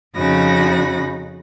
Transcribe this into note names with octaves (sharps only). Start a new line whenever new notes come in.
F2 C#3 D#4 F#4 B5 A#6